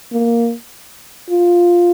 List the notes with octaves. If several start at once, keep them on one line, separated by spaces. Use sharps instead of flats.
A#3
F4